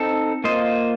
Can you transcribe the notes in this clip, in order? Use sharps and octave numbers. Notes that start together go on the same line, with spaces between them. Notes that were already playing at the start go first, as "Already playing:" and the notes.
Already playing: C4 D#4 A4
A#3 F4 C5 D#5